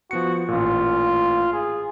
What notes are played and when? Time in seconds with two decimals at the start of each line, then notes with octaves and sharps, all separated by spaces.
0.11 F3 B3 F#4 C#7
0.48 A1 A#2 F4
1.52 G#4